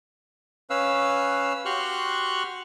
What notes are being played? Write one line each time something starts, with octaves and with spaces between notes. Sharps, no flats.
C#4 B4 F5 E6
F#4 G4 C6 C#6 F6 F#6